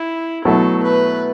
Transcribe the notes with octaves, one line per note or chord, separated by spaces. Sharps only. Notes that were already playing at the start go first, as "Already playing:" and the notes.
Already playing: E4
B2 F#3 A3 E4 A4
B4